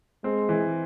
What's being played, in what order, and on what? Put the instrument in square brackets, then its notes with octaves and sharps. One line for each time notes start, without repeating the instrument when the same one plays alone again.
[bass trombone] G#3 [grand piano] C4
[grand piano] E3